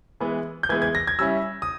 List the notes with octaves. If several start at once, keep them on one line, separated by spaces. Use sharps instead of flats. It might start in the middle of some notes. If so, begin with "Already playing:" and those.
E3 G#3 B3
G6
E3 G#3 B3 G#6
G#6
A#6
G#6
G3 C#4 E4 E6
D#6